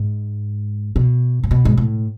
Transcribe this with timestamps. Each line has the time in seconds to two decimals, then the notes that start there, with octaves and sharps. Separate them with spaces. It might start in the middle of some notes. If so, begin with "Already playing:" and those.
Already playing: G#2
0.96 B2
1.43 A2
1.51 B2
1.65 G#2
1.77 A2